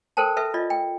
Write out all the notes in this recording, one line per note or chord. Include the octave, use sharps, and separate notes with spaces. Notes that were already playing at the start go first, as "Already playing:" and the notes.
A4 A#4 C5 G5 A5
A4 B4 E5
F4 D5 D#5
G5